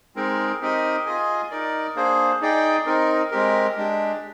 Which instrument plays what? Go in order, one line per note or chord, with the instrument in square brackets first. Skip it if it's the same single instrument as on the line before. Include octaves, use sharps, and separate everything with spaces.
[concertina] G#3 C4 D#4 A#4
C4 D#4 G4 A#4 D#5
F4 G#4 D#5 G#5
D#4 A#4 D5
A#3 D4 G#4 C5
D#4 G#4 D5 G5
C4 D#4 A#4
G#3 C4 G4 A#4
G#3 D4 G4